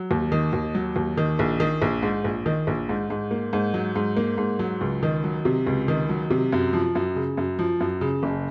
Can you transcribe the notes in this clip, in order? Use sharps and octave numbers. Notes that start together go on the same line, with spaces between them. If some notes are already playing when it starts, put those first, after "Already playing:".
Already playing: F#3
D#2
D#3
D#2
F#3
D#2
D#3
A#1
D#3
A#1
G#2
A#1
D#3
A#1
G#2
G#2
A#3
G#2
F#3
G#2
A#3
G#2
F#3
C#2
D#3
F#3
C3
C#2
D#3
F#3
C3
F#2
F3
F#2
C#3
F#2
F3
F#2
C#3
F#1